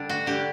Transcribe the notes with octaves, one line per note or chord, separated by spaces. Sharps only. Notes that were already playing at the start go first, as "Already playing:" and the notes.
Already playing: D3 G3 D4
F#4
D3 G3 G4